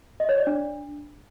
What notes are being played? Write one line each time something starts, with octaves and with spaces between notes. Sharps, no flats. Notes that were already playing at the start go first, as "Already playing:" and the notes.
D#5
C#5
D5
D4